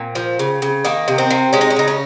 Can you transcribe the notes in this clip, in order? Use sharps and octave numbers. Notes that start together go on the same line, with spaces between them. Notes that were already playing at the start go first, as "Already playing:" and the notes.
Already playing: A#2 C4
F3
C#3
C#3
D#3 A#3
C3
C4
C3
G#3 C#4
D#4
C#4
C#3 D#4
C#4